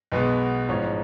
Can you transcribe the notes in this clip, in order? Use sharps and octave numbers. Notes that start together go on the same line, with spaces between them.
B1 B2 G#3 B3 B4
A1 G#2 F3 C#5